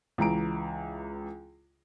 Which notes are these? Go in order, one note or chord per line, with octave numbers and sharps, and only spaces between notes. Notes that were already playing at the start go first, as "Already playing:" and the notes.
C#2 E3 A#5 D7